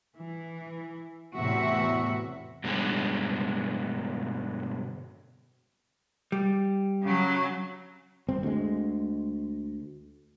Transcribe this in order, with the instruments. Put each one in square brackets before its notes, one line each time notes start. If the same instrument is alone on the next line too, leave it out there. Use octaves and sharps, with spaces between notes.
[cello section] E3
E2 A2 C3 E3 F#4 E5
[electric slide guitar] G2 B2 D3 F#3 G#3
[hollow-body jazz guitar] G3
[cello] C#3 F#3
[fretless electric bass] G1 C4
D2 G#3